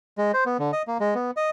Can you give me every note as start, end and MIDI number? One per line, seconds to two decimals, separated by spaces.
0.18 0.32 56
0.34 0.44 72
0.46 0.57 59
0.59 0.71 50
0.73 0.82 75
0.87 0.98 58
1.00 1.14 56
1.15 1.31 59
1.37 1.50 75